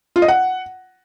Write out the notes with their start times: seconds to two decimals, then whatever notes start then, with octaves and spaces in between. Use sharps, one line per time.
0.16 F4
0.22 D#5
0.28 F#5